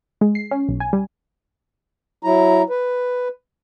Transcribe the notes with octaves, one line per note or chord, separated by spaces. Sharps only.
G#3
C7
C#4
B1
G#5
G3
F#3 E4 A#5
B4